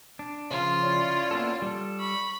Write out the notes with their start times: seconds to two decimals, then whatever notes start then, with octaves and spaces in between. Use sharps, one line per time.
0.19 D4
0.51 C#3 F3 F4
0.81 C#4 E4 D5
1.31 A#3 B3 A4
1.62 G3 A4
2.00 B5 C#6